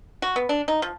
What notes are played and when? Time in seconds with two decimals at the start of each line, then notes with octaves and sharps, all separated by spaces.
0.22 F#4
0.36 B3
0.49 D4
0.68 D#4
0.82 F3